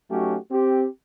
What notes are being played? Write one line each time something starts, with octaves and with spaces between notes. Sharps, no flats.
F#3 A3 C#4 D#4 F#4 G4
C4 G4